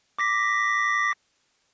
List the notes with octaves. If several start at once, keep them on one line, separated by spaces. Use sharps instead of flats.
D6 A#6 B6